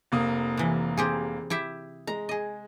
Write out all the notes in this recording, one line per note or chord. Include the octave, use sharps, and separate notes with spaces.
F1 A#3 D#6
C3 E3
C4 G4 G#4
E4 G4 E5
G#3 A#5
G#4 D#5